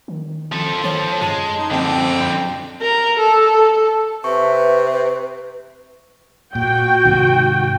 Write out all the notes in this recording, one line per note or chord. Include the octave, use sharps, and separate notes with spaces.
D#3
F3 A4
D#3 C#5
F#2 G#3 A5
D#4
F2 D3 C4
A#4
A4
C3 B4 E5 C#6
A#2 F#4 G5
G#2 C3 D#3